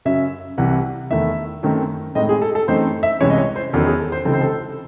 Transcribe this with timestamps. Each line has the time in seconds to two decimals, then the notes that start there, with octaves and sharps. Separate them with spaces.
0.05 F#2 C#3 F#3 C#4 E5
0.58 C2 C3 E3 F#5
1.11 E2 D#3 A3 E5
1.63 F#2 D#3 A3 C4
2.15 A2 G#3 C4 D#4 D#5
2.29 G#4
2.42 A4
2.55 A4
2.68 F#2 E3 A3 C4 D#4 C5
3.03 E5
3.21 C2 C3 E3 G#3 C#4 C#5
3.30 D#5
3.38 C#5
3.56 C5
3.73 E2 D#3 F#3 C#4 A4
3.86 G#4
3.99 A4
4.12 C5
4.25 C#2 C3 E3 C4 D#4 A4
4.33 C5
4.41 A4